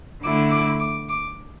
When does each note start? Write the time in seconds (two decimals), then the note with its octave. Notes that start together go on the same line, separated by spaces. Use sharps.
0.23 D3 A3 E4 D6
0.50 D6
0.80 D6
1.08 D6